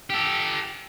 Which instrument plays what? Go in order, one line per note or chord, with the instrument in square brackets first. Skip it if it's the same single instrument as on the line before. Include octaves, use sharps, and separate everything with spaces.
[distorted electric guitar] G4 A4